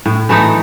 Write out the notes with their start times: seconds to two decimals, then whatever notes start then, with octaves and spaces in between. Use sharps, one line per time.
0.06 A2
0.29 E3 A3 D#4